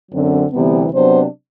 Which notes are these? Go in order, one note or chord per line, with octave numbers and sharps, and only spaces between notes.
F#2 D3 F#3 C4
D2 C3 E3 G3 B3
C3 F#3 B3 D4 C5